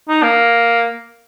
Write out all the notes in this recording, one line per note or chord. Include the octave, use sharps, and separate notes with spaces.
D#4
A#3